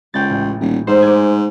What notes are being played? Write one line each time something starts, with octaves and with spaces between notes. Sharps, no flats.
C#2 G5 A6
A1
D#1
G#2 C5
G#5 D6